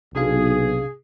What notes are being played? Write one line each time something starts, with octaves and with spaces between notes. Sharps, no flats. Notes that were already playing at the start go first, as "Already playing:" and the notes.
B1 C3 D4 G#4 F5